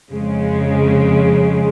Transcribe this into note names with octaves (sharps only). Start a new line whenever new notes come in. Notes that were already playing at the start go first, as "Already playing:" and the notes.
F2 C#3 G#3